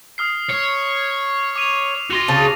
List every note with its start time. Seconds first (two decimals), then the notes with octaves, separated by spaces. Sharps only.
0.18 D#6 F6 C7
0.49 C#5 C#7
1.56 D6 D#7 F7
2.10 F#4 C6 A#6 F7
2.28 C#3 A5